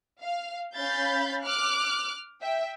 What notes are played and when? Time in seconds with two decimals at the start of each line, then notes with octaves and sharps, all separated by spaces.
0.21 F5
0.75 C#4 F5 B5 G6 A6
1.45 D6 F6 F#6
2.42 E5 G5